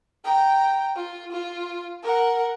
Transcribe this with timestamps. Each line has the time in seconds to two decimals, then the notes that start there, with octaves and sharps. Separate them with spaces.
0.25 G5 A#5
0.96 F4
1.32 F4
2.03 A#4 F#5